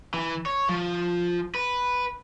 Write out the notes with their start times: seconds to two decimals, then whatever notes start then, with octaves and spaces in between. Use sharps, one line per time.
0.14 E3
0.46 C#5
0.69 F3
1.55 B4